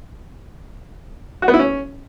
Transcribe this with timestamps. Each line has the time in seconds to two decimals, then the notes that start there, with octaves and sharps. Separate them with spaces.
1.42 F#4
1.48 B3
1.54 E4
1.59 C#4